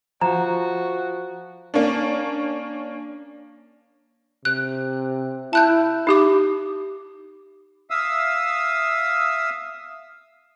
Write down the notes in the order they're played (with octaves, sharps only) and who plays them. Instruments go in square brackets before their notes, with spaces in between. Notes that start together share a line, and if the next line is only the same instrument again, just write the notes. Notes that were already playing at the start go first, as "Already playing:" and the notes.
[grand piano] F3 [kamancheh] F#4 [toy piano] A#5
[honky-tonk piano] A#3 C#4 D4
[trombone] C3 [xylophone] F#6
[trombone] E4 [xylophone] A5 F#6 G6
[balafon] D#4 G4 D6
[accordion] E5 F5 D#6 E6